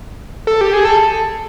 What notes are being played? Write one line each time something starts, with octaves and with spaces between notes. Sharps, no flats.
A4
G4
G#4
A4